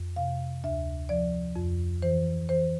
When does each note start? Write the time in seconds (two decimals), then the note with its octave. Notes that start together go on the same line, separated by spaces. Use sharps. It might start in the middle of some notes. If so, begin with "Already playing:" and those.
Already playing: F2
0.16 C3 F5
0.64 D2 E5
1.09 F3 D5
1.56 F2
2.02 E3 C5
2.49 E3 C5